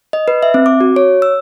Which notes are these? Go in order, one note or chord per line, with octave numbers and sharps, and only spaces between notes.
D#5
B4
E5
C4
D6
F#4
C#5
E6